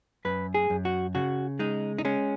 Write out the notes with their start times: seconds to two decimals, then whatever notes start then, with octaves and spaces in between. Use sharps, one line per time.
0.25 F#2 B4
0.54 G#4
0.70 F#2
0.85 F#4
1.15 C#3 F#4
1.59 G#3 D#4
1.98 D#4
2.05 G#3 C#4